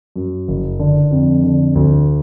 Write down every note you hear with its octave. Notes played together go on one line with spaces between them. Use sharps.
F#2
F#1
D3
F2
D3
D2